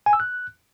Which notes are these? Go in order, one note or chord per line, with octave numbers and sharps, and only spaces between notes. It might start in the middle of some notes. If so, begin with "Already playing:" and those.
G#5
E6
F#6